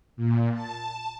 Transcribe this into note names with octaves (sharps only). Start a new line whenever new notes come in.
A#2
A5